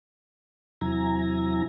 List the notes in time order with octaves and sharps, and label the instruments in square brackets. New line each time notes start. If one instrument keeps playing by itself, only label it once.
[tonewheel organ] E2 C3 F#3 E4 G#5 A#5